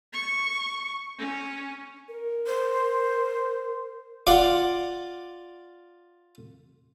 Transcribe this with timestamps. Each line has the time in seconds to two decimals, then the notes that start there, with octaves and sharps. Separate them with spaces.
0.13 C#6
1.19 C#4
2.09 A#4
2.47 C5
4.27 F4 D5 F5 F#5